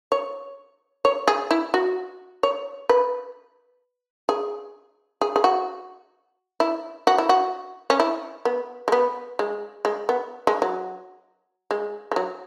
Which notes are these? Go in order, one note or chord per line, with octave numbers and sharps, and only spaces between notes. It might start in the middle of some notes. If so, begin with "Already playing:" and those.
C#5
C#5
G#4
E4
F#4
C#5
B4
G#4
G#4
G#4
F#4
E4
F#4
E4
F#4
C#4
E4
B3
G#3
B3
G#3
G#3
B3
G#3
F#3
G#3
G#3
F#3